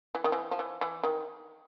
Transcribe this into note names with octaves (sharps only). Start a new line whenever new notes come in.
E3
D#3
E3
F3
E3
E3
D#3